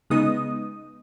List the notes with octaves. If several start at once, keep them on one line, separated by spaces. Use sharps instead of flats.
C#3 G#3 B3 D#4 D#6